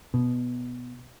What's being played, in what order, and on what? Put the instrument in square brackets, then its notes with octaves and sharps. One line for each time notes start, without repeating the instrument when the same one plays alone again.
[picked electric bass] B2